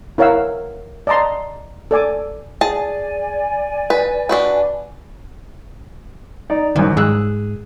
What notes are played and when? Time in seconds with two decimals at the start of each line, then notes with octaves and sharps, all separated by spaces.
0.18 E4 A#4 C#5 F5 F#5 E6
1.07 D5 D#5 A5 A#5 C6
1.91 A4 D5 G#5 D6
2.61 G#4 D5 G#5 A5
3.90 B4
4.29 D4 F#4 B4
6.50 D#4 D5
6.76 C2 F#2 D#3
6.97 G#2 G#4 E6 F#6